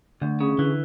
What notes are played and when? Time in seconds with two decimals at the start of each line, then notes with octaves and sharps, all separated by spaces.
0.21 D2 D3
0.41 C#3
0.58 D3 E3